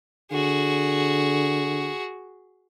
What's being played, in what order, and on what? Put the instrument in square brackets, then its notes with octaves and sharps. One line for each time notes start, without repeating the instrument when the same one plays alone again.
[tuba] D3 [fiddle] F#4 G#4